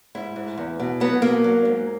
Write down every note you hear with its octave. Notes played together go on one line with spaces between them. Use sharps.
G#2 E4
G#2
E2
B2
F#3 B3
B2 A#3
F#3
G#2